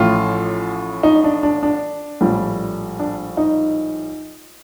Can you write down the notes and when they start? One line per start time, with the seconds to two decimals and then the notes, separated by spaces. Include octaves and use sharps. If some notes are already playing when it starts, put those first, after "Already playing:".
Already playing: A1 A2 F3 F4
1.03 D#4
1.24 D4
1.43 D4
1.63 D4
2.21 A#1 A2 G3
2.99 D4
3.37 D#4